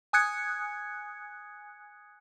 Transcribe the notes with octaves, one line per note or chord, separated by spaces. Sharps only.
G#5 D#6 F#6 G#6 C#7